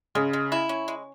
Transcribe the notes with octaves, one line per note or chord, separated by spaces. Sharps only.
C#3 G#3
G#3
E4
C#4
G#3